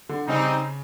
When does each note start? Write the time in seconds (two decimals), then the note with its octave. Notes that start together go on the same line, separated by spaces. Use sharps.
0.09 D3
0.27 C#3 G3 C4 D#4